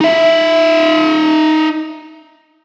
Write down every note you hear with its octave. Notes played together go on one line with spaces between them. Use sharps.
D#4 E5